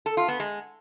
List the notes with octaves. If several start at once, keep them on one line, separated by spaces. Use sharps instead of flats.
A4
F4
B3
G#3